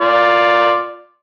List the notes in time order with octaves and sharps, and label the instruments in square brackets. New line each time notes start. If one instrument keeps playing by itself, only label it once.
[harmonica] F4 D5